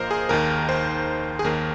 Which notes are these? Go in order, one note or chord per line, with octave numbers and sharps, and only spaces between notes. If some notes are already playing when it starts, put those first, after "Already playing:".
Already playing: A#1 A#2 F3 A#4 C5 D#5 F5
G#4
D#2 D#3 A#4
C5
G#4
D#2 D#3 A#4